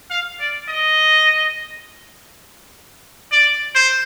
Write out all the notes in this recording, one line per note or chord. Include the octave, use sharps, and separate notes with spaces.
F5
D5
D#5
D5
C5